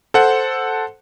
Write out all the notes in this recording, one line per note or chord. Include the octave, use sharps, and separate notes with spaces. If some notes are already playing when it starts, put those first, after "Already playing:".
A4 C5 F#5